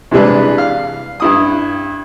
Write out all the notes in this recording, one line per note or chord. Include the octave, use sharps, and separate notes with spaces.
C3 E3 G3 G#3 D4 B4
F5
G2 E4 D#6